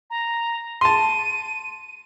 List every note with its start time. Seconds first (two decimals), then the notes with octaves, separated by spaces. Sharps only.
0.10 A#5
0.81 A5 C6 D#7